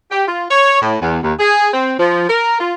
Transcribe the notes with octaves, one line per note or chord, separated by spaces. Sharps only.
G4
F4
C#5
A2
E2
D#2
G#4
C4
F3
A#4
F4